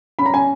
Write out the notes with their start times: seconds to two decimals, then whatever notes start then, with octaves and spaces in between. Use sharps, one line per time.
0.19 C#4 B5
0.26 A#5
0.34 C#4 G#5